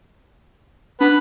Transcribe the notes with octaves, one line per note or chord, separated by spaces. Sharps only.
D4 B4